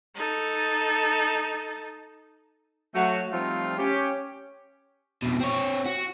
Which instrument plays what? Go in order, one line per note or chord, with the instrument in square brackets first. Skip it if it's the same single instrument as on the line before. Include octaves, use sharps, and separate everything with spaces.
[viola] D#4 A4
[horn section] F#3 A3 F#4
F3 G3 A3 C4 D#4 F4
C#4 G4
[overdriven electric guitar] F2 B2
C4 C#5
F#4